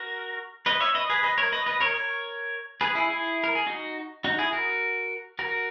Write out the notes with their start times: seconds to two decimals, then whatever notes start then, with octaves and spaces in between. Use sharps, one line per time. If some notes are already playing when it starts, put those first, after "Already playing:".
Already playing: F#4 A#4
0.66 B4 D#5
0.80 C#5 E5
0.95 B4 D#5
1.10 G#4 B4
1.23 B4 D#5
1.38 A#4 C#5
1.52 B4 D#5
1.66 B4 D#5
1.80 A#4 C#5
1.95 A#4 C#5
2.81 G#4 B4
2.95 E4 G#4
3.10 E4 G#4
3.44 A#4
3.55 G#4
3.66 D#4 F#4
4.24 D#4 F#4
4.38 E4 G#4
4.53 F#4 A#4
5.39 F#4 A#4